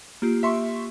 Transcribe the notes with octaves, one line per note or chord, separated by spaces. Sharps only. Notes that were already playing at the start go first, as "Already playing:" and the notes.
A#3 F4 G4
E5 C6 C#6